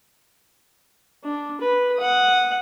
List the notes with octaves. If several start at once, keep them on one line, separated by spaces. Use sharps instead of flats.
D4
B4
F#5 D#6